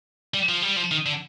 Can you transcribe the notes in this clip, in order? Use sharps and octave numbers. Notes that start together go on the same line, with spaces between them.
G3
F3
G3
F3
D#3
D3